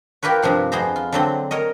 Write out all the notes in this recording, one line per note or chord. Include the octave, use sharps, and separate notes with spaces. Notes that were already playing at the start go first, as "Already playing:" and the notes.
F4 G4 A#4 B4 C#5
G2 C3 F3 F#5
F2 B3 G#4 C5 A#5
F4
D3 F#3 C4
A#4 C#5 D#5